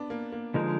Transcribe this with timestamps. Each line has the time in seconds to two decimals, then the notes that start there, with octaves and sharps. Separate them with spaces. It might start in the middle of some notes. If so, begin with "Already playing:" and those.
Already playing: B3 D4
0.10 A#3
0.32 A#3
0.54 D3 F3 G#3 A#3 D#4 A#4